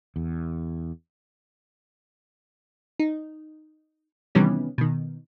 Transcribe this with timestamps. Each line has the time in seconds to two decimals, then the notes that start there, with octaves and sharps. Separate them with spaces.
0.16 E2
2.99 D#4
4.35 C3 D#3 E3 G3 B3 C#4
4.78 B2 D#3